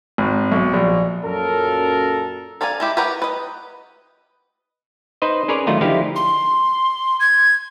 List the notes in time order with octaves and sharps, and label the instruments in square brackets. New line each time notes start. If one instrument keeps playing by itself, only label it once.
[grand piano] G#1
B1
A#1
[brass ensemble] F#2 A#2 A#4 [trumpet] A4
[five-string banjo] A4 A#4 D5 F5 G#5
G#3 E4 G4
G4 A#4 B4 C#5 F#5
B4 D#5
[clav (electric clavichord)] D#4 B4 C5 D#5
C#4 G#4 A#4 B4 C#5 D5
D#3 F#3 A3 F4 D#5 A#5
D3 F3 D#4 E4 G4 F5
[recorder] C6
G#6